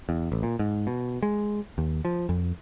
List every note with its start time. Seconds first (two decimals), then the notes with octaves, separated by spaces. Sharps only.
0.09 E2
0.32 A1
0.43 A#2
0.59 G#2
0.87 B2
1.23 G#3
1.78 D#2
2.05 F3
2.29 F2